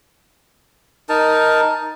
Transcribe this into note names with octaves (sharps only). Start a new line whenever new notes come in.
D#4 A#4 A5